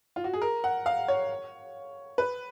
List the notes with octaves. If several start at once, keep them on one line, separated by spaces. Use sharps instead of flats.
F4
F#4
G#4
A#4
F#5
F5
C#5
B4